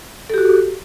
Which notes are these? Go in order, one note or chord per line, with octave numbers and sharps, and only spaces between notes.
F#4 G4 A4